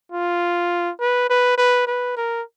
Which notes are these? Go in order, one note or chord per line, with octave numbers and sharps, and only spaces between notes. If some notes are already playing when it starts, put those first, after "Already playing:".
F4
B4
B4
B4
B4
A#4